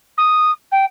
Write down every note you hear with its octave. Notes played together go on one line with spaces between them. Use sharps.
D#6
G5